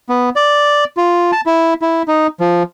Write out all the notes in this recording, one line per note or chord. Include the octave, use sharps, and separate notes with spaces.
B3
D5
F4
A5
E4
E4
D#4
F3